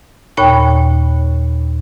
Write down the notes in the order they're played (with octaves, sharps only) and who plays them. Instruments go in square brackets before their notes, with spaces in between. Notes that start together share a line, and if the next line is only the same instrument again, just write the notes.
[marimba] D#2 A#2 C#5 G5 B5 C#6